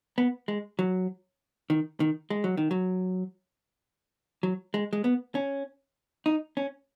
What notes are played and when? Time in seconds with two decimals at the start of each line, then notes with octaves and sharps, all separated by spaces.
0.18 B3
0.48 G#3
0.79 F#3
1.70 D#3
2.00 D#3
2.30 G#3
2.44 F#3
2.57 D#3
2.71 F#3
4.43 F#3
4.74 G#3
4.93 G#3
5.04 B3
5.35 C#4
6.26 D#4
6.57 C#4